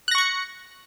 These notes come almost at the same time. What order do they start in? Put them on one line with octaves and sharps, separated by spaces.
F#6 A#6 C#6 C#7